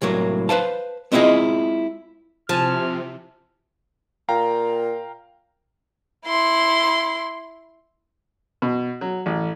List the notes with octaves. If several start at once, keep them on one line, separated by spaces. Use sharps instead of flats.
C2 A2 F#3 A#3
B4 C5 F5 A5
G#3 C4 E4 F4 G#4 D#5
C3 F3 G#5 A5 F6
A#2 F5 G5 A#5
E4 C6
B2
F#3
A1